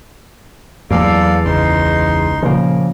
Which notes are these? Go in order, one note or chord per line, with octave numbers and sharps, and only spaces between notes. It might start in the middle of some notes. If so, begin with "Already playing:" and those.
E2 F#3 G3 A#3 A4 D5 F5
G#1 C#2 C#3 D#4 C6
A#2 C#3 F3 A#3